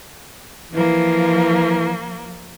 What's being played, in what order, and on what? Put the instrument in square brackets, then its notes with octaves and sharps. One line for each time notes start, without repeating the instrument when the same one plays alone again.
[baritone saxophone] E3 [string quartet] F3 A#3